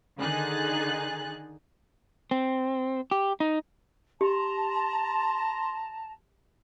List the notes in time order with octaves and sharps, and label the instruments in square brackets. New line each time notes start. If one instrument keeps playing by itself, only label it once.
[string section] D3 D#3 D#4 G#4 F#6 A6
[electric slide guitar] C4
G4
D#4
[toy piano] G4 [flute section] A5 A#5 [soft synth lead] C6